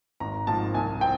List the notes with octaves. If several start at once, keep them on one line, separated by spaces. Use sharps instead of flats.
G#1 A#5
G#2 F3 A5
C2 G#5
C4 G5